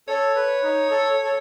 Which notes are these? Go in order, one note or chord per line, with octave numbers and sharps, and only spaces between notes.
A4 C#5
B4
D#4
A4
A4